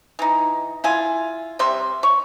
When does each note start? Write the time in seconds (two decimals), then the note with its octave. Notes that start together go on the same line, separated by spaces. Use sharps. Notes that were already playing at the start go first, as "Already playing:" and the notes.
0.19 E3 D#4
0.84 E4 F4 G#5
1.59 C3 G3 E5 C6
2.03 C#5